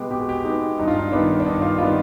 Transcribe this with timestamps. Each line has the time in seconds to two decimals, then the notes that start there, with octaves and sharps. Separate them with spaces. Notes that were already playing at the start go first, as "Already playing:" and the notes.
Already playing: B2 G#3 B3 G4
0.10 B2 G4
0.20 G#4
0.29 G4
0.44 G#3 B3 D#4
0.78 G2 D#4
0.88 F4
0.98 D#4
1.12 D#3 G3 B3 D4
1.40 D4
1.45 G2 D#4
1.62 F4
1.78 D#3 G3 B3 F4